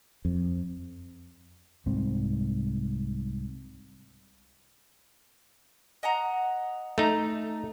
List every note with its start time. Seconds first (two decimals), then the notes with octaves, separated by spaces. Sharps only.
0.25 F2
1.86 C2 G#2 C4
6.03 D#5 F#5 A#5
6.98 A3 D#4 A#5